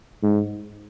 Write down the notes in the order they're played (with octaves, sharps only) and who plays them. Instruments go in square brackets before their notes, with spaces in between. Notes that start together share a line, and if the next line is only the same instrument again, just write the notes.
[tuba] G#2